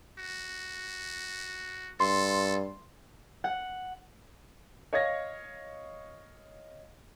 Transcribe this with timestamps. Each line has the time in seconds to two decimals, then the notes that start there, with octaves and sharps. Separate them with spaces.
0.19 F#4
2.00 G2 A4 C6
3.44 F#5
4.93 C#5 D#5 F5 G#6 A#6